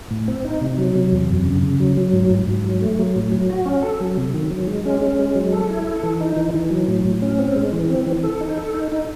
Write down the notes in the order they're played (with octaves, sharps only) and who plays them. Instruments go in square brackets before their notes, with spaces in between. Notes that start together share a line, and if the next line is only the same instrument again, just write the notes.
[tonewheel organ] A2
C4
D#4
C3
F#3
C3
E2
F#2
C#3
C#3
F#3
F#3
G#2
G#2
G#2
F#3
A3
F#3
A2
F#3
F#4
C#4
A4
F#3
C3
D#3
F#3
G#3
C#4
C#4
G#3
F#3
A4
E4
A4
E3
D#4
E3
E3
F#3
A2
A2
C#4
C4
G#3
E3
C4
E3
A4
D#4
A4
D#4
D#4